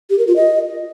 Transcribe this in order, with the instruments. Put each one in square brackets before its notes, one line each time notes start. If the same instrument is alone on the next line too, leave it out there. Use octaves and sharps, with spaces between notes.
[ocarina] G4
A#4
F4
D#5